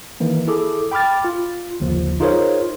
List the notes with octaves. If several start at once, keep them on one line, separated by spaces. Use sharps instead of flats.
D#3 E3 A#3
E4 G#4 A4 D6
G5 B5 D6 F6 A6
F4
G1 D#2 C#3 F3
D#4 F4 G#4 A#4 C5 C#5